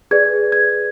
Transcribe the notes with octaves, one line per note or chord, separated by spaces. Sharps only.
G#4 B4 D5 G#6
G#6